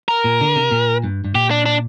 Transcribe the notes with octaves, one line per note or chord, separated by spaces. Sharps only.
A#4
A#2
D3
C3
A#2
G2
G2
A#2 G4
D4
D4